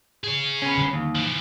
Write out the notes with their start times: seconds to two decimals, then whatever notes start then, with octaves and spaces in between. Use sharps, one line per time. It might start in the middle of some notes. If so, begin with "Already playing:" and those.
0.24 G#4 C#5
0.62 B3 C#4
0.78 D3 G3
0.93 D#2
1.15 E3 F3